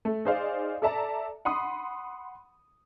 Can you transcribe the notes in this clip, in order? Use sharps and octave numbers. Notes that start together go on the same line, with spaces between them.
A3
D#4 G#4 C5 D5 F5
A4 D5 E5 A5 A#5
F#5 B5 C6 D#6